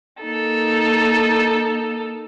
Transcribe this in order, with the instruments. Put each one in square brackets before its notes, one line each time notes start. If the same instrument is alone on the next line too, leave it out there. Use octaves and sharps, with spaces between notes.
[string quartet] A#3 D#4 A4